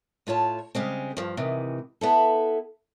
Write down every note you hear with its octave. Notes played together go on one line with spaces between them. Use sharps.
A2 F4 C#5 A5
C#3 G3 G#3 C4
G2 F3
G#2 C3 D#3 E3
B3 E4 A4